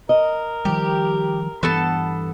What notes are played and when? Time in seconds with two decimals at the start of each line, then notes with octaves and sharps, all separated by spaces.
0.09 A#4 D#5
0.65 D#3 F3 G3 G4
1.63 G2 E3 B3 A4 A5